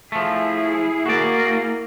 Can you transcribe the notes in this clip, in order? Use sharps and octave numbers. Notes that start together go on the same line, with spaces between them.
F3 A3 E4 G#4
A#3 F#4 D5